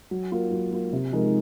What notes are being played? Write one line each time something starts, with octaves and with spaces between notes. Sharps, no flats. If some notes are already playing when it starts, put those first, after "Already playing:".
F#3
A#3 F4
F#3
A#3 F4
C3
F3 G#3 D#4 A#4